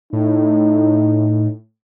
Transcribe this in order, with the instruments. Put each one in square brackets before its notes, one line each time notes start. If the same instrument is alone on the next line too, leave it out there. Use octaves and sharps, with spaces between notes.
[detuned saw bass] A2 [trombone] D#4